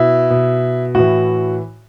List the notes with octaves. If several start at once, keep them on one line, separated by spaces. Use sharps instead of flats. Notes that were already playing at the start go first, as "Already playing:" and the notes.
Already playing: B2 E4
B2
A2 E3 F#4